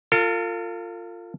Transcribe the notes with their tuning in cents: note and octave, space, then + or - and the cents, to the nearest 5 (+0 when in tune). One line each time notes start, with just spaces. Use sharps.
F4 +0 A4 +45